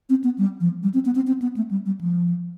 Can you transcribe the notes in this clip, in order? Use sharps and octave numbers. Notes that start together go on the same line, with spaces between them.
C4
B3
G3
F3
G3
C4
B3
C4
C4
B3
A3
G3
G3
F3